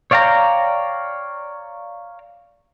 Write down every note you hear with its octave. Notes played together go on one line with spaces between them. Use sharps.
C#5 D5 F5 G5 A#5